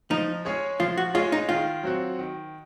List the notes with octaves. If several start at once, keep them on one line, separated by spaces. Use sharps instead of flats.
F3 D#4
G#3 C#4 G#4 C#5
F3 F4
F#4
G#3 C#4 F4 G#4 C#5
D#4
D#3 F4
F#3 C4 F#4
D#3